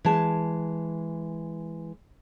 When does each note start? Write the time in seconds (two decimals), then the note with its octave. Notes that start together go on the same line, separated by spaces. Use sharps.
0.05 E3 G#3 A5